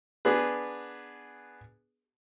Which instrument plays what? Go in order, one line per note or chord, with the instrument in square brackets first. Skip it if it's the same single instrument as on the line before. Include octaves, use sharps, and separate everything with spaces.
[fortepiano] B3 D4 G#4 B4